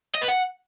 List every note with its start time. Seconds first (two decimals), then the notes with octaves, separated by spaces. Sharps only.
0.15 D#5
0.21 B4
0.28 F#5